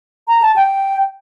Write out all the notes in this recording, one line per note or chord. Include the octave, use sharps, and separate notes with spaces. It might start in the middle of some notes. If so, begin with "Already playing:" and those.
A#5
A5
G5